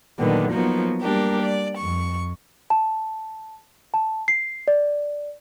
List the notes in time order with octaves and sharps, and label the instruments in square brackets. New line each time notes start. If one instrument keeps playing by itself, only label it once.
[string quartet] A#2 D3 D#3 F#3 G3 B3
F3 F#3 A#3 B3 D#4 F#4
G3 A#3 D4 G4 A#4
D5
F2 C#6
[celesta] A5
A5
C7
D5